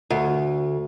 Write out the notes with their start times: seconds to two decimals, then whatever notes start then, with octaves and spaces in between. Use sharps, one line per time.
0.10 D2